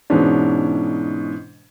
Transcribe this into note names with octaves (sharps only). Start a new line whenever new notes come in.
G#2 B2 E3 C#4 D4